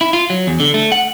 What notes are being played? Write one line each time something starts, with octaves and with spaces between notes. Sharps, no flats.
E4
F4
F#3
E2
D3
A3
F#5